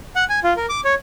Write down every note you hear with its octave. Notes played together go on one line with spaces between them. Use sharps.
F#5
G#5
F4
A#4
D6
C#5